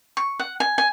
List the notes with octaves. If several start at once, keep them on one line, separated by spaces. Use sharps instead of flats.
C#6
F#5
G#5
G#5